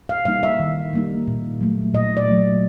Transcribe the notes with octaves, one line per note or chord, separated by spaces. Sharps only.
F5
G3 A#3 D#4 F5
E5
D#3
G3 A#3 D#4
A#2
F#3 A3
A#2 D#5
D5
F#3 A3